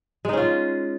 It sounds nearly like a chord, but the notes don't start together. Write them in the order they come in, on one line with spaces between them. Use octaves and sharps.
G#3 D#4 C#4 F4